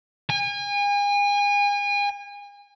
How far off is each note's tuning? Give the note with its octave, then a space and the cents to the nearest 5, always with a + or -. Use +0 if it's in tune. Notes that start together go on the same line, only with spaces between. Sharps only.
G#5 -35